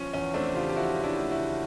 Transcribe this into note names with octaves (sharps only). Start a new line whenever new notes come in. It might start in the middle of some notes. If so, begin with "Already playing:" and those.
Already playing: F3 C#4
E2 C#4
A3 C4 D4
C#3 F4 G4
G4
F3 E4 F#4
E2
D4 E4
A3
E4 F#4
C#3